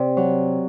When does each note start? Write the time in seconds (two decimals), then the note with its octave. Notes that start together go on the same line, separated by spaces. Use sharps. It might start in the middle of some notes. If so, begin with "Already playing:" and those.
Already playing: C3 D5
0.17 F#3